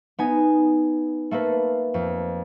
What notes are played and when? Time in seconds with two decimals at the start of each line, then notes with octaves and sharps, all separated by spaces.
0.19 B3 D#4 G#5
1.31 A3 A#3 A4 B4
1.94 F2